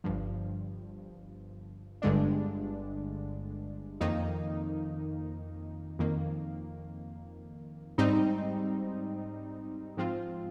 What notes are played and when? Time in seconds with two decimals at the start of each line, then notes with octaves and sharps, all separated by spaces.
0.04 G1 G2 F3
2.02 G1 G2 D3 G#3 D4
4.01 F2 D#3 A#3 D#4
5.99 F2 D#3 A#3
7.98 G#2 G3 C4 D#4
9.97 G#2 F3 C4 F4